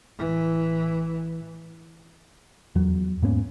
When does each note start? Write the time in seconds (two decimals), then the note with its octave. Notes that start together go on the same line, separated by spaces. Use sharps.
0.18 A1 E3
2.75 E2 F#3
3.22 G#2 A#3 B3 C#4